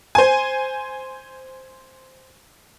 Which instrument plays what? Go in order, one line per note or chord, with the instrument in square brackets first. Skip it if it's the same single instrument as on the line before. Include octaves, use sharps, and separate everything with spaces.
[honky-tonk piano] C5 G#5